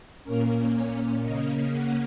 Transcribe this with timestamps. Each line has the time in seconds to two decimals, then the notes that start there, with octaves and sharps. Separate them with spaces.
0.24 A#2 A#3 C#4 A#4
0.73 C#5
1.22 C#3 A#3 C#4 D#5
1.72 F#5